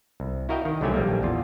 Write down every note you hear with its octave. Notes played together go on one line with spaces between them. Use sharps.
C2
E4 F#4 A#4 D#5 F5 G5
D#3
C2 D3 F#3 A3 G4 G#5
A#1 G3 A#3
E2 F4